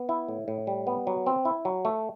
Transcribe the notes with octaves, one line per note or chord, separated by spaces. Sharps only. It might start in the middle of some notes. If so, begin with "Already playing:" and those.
Already playing: B3
E4
A2
A2
G3
B3
F#3
C4
E4
F#3
A3